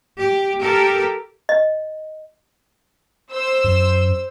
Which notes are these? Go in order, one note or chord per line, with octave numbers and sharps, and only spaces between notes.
G4
G4 A4 A#4
D#5
C5 E6
F#2